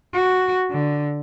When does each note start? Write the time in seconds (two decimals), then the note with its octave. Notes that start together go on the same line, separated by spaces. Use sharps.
0.13 F#4
0.71 D3